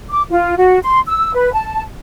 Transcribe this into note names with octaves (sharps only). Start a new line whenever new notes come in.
D6
F4
F#4
C6
E6
B4
A5